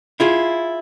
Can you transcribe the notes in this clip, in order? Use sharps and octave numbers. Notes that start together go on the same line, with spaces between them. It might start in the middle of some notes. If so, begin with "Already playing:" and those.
E4 F4 G#4